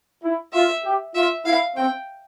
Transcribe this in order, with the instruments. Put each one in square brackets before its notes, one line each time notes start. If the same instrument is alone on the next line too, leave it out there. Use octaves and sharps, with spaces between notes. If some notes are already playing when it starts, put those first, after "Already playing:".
[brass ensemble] E4
[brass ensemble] F4 [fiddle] E5
[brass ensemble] G4
[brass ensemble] F4 [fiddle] E5
[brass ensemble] E4 [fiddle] F5
[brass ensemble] C4 [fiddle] G5